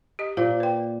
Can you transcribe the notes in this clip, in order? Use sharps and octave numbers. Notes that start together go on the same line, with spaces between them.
G4 D#5
A#2 C5 F5
B4 G5